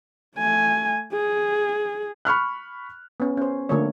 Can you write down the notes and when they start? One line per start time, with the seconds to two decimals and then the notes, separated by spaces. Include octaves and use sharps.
0.37 A3 G#5
1.13 G#4
2.25 B5 C#6 F6 F#6
3.20 B3 C#4
3.37 C#4 C5
3.69 D3 F3 A3 A#3 C#5